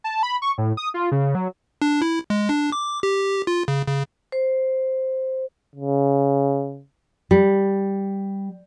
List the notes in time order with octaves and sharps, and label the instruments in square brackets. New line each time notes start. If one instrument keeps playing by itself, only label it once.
[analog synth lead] A5
B5
C#6
A2
D#6
F4
C#3
F#3
[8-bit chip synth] D4
E4
G#3
D4
D6
G4
F4
C#3
C#3
[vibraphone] C5
[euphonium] C#3
[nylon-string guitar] G3